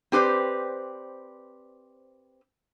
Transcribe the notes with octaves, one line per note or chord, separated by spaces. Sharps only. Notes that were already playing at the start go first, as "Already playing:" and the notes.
C4 G4 B4 C5 D5